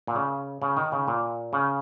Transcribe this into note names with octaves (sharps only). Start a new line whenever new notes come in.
A#2
C#3
C#3
D#3
C#3
A#2
C#3